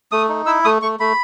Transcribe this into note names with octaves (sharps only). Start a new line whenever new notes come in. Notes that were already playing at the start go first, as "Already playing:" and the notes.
A3 D#6
D#4
E4 E6
A3 D#6
A3 C#6
A3 B5